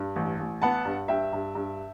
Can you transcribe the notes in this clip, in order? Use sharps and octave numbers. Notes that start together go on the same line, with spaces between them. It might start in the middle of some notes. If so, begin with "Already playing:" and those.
Already playing: G2
A1
A1
B3 F#5 A5
G2
G2 E5 G5
G2
G2